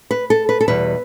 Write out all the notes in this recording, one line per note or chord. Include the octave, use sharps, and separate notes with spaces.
B4
A4
B4
A4
E2 B2 G3 B4